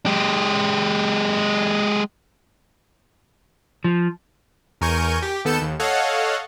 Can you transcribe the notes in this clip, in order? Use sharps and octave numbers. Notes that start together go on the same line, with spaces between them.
G#3 G4
F3
E2 A#4 G#5 C#6 G6 D#7
G4
D#2 B3 A4 G6 C#7 E7
D#2
A4 C#5 D#5 F5 F#5